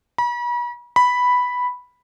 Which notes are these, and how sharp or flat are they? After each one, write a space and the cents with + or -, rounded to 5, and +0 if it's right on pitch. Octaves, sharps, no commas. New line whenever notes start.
B5 -40
B5 +0